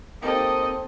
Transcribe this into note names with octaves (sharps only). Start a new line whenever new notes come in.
A#3 C4 D#4 G4 A4 D#5